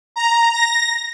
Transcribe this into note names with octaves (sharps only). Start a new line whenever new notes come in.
A#5
A#6